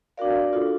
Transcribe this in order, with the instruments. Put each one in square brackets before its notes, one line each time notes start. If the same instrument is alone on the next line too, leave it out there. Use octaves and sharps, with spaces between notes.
[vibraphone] D4 F#4 A#4 D5 F5
D4 F4 A4